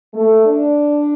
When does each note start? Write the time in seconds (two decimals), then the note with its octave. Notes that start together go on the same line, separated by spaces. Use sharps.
0.14 A3
0.46 D4